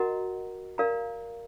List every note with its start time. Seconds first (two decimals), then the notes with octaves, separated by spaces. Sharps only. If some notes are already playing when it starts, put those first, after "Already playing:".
Already playing: F#4 A#4 D#5 F#5 A#5
0.78 A#4 D5 F5 A#5